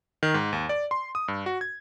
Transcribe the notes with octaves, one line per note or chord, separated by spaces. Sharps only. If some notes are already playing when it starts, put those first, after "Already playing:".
D#3
G#2
D#2
D5
C6
D#6
G2
F#4
G#6